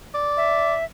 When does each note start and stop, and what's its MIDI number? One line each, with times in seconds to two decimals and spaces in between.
0.14 0.75 74
0.37 0.84 76